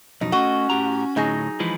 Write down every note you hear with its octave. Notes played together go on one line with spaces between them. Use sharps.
B1 F2 B2 D#4
A3 C#4 F#4 D#5
A2 G4 A#5
D2 A2 F#3 D#4 G#4
E3 F3 G#3 B5